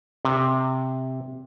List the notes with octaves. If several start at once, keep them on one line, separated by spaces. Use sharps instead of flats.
C3